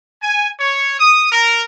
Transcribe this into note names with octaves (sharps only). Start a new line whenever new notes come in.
G#5
C#5
D#6
A#4